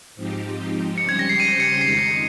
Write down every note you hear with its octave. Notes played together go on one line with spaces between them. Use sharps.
G#2 F3 C4 D#4 G4
C#3 G3 C#4 G4 C5 C#7
G#6
A#6
C7
D#7
C#7
F2 D#3 G#3 D#4 C7